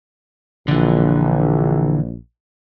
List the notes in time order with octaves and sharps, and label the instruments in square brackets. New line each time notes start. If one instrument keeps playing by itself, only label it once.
[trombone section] A#1 [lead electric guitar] D3 E3